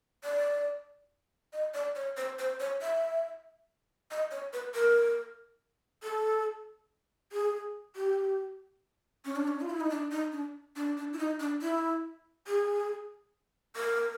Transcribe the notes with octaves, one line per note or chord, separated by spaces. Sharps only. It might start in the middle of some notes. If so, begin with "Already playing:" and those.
D5
D#5
D5
C#5
C5
C5
C#5
E5
D#5
C#5
B4
A#4
A4
G#4
G4
C#4
D4
C#4
F4
E4
D#4
D4
D#4
D4
D4
D4
E4
D#4
D4
E4
G#4
A#4